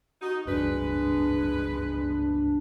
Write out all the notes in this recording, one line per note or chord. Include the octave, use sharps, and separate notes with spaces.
D#4 F#4
D1 C#2 G2 G#3 D4 B4